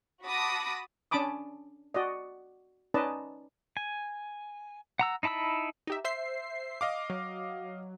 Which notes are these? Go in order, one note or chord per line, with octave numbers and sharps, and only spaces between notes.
F#4 A5 B5 D6 D#6 A#6
C#4 D4 A5 B5 D6 D#6
F#4 D5 D#5
C#4 D#4 B4 D5 D#5 A5
G#5
F#5 A#5 E6
D#4 E4 A5 B5 E6
D#4 G4 E5
C5 E5 C7
D#5 F5 D6
F#3